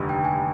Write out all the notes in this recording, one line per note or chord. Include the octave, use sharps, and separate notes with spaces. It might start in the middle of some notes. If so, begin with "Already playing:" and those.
Already playing: F1 D#2 D3 G3
G5
G#5